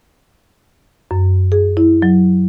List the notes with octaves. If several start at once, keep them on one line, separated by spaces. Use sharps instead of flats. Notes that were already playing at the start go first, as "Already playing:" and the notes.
F#2
G#4
E4
F#3